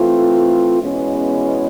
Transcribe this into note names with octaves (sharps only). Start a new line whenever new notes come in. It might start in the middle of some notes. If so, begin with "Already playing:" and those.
Already playing: E3 A3 C4 F4
E2 B2 G#3 C#4 E4